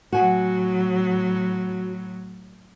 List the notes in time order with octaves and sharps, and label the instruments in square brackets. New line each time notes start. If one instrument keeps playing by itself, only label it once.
[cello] A2 F#3 [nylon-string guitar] F#4 G#5